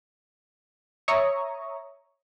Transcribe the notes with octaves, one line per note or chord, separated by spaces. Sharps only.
C#5 E5 A#5 C#6 D#6